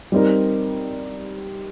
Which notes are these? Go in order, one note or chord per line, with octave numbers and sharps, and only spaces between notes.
G3 C4 D#4 A#4